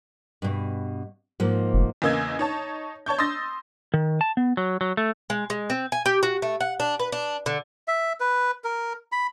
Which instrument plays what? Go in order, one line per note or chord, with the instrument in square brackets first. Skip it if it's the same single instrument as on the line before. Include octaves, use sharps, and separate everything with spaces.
[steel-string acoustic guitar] G2 B2
G#2 F3 A#3
[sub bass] F1
[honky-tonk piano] E2 C#3 A#3 D#5 E6 G#6
D#4 C#5 A5
C#5 A5 C#6 G6
C6 D#6 E6 G6 A6 A#6
[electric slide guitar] D#3
A5
B3
F#3
F#3
A3
[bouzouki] G#3
G#3
C4
G#5
G4
F#4
A3
F#5
D4
B4
D4
D3
[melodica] E5
B4
A#4
B5